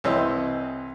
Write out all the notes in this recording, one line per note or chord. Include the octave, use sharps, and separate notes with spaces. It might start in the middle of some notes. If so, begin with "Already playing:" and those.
C2 E3 C4 C5 D#5 E6